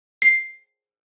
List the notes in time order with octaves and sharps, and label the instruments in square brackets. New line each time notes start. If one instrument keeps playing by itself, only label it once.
[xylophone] C7